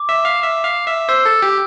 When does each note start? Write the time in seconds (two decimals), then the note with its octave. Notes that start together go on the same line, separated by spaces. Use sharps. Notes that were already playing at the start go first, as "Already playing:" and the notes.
Already playing: D6
0.09 E5
0.25 F5
0.42 E5
0.64 F5
0.87 E5
1.09 C5 E6
1.25 A4
1.42 G4